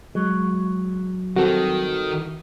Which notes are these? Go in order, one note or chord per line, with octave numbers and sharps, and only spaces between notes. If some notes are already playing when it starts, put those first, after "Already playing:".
F#3 G#3
D#3 G3 C4 F#4 A4